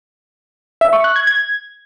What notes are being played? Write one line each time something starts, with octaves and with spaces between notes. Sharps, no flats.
E5
C#6
F#6
G#6
G#6